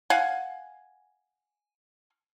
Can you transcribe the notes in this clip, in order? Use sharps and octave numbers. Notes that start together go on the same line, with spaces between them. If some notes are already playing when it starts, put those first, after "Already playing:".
F5 F#5 G#5